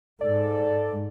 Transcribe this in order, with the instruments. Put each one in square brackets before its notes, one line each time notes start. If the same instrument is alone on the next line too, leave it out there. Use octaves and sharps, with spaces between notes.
[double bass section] G#2 [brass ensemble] A4 [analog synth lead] D5